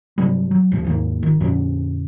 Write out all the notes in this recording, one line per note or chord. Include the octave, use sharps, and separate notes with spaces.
G2 C3 F#3 G3
F#3
D1 A2 F3
D#2 G#2 A#3
G1 D#3
F2 A#2 D3 C#4